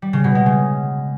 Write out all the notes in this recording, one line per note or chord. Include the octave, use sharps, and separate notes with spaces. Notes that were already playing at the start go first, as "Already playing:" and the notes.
G3
C#3
B2
G#3
C#3